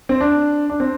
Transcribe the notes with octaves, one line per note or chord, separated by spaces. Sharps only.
C4
D4
D4
C4